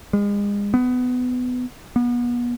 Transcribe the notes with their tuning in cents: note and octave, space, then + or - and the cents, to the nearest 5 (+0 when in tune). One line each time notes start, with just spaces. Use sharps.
G#3 -35
B3 +20
B3 -35